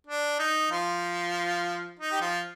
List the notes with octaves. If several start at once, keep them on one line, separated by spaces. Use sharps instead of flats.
D4
D#4
F3 F4
D#4
G4
F3 F4